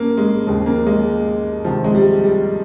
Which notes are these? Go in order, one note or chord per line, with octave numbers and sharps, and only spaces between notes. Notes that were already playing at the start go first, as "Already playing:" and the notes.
Already playing: G1 G2 A#3 C#4
G#3
D#2 C#3 F3 G#3
A#3
G#3
C#2 C3 D#3 F3
G#3
G3
G3